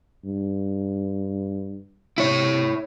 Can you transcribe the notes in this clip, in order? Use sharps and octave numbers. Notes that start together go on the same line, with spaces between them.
G2
C3 E4 C#5